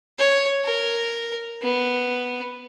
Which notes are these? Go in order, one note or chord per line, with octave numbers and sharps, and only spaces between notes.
C#5
A#4
B3